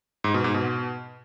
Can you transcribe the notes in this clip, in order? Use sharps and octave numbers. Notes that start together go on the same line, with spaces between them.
G#2
B2
G#2
B2